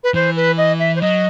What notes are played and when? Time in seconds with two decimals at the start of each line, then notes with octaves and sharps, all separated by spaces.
0.04 B4
0.14 E3 C5
0.36 B4
0.57 D#5
0.79 E5
0.96 C5
1.01 F#3 D#5